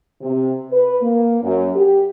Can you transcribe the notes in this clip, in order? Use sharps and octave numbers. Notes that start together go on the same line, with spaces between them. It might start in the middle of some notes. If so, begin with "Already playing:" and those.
C3
B4
A#3
F#2
G4